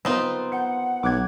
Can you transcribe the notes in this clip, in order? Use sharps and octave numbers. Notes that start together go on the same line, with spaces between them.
B3 C4 D#4 F4 B4
F#5 G6 C#7
B1 D6 F#6 G#6